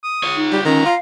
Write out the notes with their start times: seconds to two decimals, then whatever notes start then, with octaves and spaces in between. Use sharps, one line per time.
0.04 D#6
0.23 F4 C#5
0.36 D#4
0.52 G3 G4
0.65 D#3 C#4 A#5
0.86 F4 F5